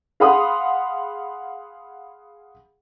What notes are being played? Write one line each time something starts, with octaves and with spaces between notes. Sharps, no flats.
G#4 F5 F#5 B5 C6 D#6